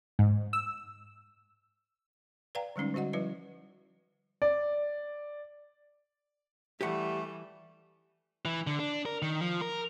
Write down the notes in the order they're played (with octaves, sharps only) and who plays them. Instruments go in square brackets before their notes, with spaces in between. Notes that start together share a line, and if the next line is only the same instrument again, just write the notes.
[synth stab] G#2
E6
[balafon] B4 D5 F5 G5 A#5
D3 G3 G#3 C#4 D#4
D3 G3 F#4 D#5 F#5
F3 G3 E4 B4 D#5
[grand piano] D5
[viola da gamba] E3 G3 [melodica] A3 [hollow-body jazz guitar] G4 B4 F#5
[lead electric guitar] E3
D3
D4
A#4
D#3
F3
A#4